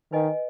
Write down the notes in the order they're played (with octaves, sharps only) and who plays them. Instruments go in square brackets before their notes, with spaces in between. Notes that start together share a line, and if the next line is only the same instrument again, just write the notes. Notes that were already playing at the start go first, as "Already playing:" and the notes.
[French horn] D#3 [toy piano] B4 D#5 G#5